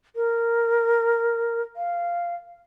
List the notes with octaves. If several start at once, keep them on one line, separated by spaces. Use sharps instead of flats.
A#4
F5